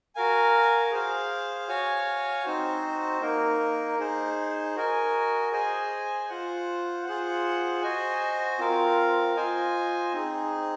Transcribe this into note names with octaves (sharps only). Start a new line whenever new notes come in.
F#4 A#4 F5 G#5
G#4 C5 F5
F#4 C#5 F5 G#5
C4 D#4 F#4 C5
A#3 D#4 A#4
D#4 G#4 C5
F#4 A#4 D#5 G#5
G#4 C5 D#5 G#5
F4 C5 F#5
F4 G#4 C5 F#5
F#4 C5 D#5 G#5
C4 F4 A#4 F5
F4 C5 D#5 G#5
C4 D#4 G#4